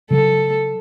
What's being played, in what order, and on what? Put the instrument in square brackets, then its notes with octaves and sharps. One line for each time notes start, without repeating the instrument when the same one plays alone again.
[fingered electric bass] C#3 F#3 [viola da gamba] A4